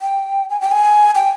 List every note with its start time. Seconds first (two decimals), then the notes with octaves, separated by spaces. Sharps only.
0.02 G5
0.50 G#5
0.61 G5
0.72 G#5
1.15 G5